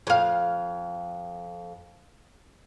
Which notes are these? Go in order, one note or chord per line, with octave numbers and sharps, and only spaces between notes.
F2 F5